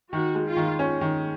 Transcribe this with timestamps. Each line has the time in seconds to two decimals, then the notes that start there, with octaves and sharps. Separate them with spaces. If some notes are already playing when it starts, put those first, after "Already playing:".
0.12 D#3 F#4
0.35 G#3
0.46 F4
0.56 D#3
0.79 C#4
1.01 D#3